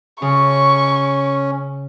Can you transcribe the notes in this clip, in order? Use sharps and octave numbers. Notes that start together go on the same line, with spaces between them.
C#3 C#4 C#6